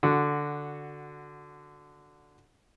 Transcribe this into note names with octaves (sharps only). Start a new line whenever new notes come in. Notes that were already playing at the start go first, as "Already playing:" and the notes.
D3 F#4